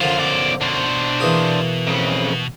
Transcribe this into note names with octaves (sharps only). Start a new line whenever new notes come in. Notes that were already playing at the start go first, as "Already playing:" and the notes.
F#2 D3 F3 E4 F4 C5
B1 D5
B2 D4 C5
E3 A#3 G#4
F2 C#3